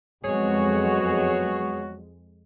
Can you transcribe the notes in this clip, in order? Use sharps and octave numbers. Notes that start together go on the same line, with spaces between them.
F2 F#3 G#3 B3 F#4 G#4 C#5